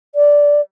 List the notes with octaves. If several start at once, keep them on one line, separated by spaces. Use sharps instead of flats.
D5